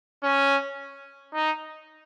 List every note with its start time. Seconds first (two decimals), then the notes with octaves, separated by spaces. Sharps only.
0.23 C#4
1.34 D#4